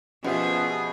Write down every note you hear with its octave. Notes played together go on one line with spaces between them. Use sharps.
B2 F3 B3 C#4 G4 G#4 E5